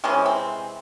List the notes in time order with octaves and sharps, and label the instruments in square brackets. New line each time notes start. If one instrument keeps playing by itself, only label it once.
[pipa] C3 E3 G#3 C#4
C4